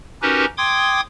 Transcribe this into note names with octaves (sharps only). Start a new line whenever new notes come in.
C#4 D#4 F#4 G4 A#4 B4
G5 C6 D6 D#6 G#6